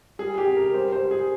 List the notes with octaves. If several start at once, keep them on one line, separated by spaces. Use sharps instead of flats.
G3 G#4
G4
C3
A#4
G3 C5
C5
G3
G#4